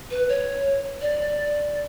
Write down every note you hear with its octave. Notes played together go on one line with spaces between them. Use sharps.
B4
C#5
D5